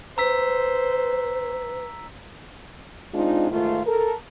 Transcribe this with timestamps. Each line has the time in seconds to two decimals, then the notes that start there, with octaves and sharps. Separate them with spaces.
0.18 B4 C5 A#5 E6 B6
3.14 G#3 C4 D4 D#4 F4
3.50 G#2 D#3 A3 D#4 F4
3.86 A4 A#4